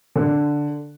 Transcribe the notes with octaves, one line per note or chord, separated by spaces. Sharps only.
D3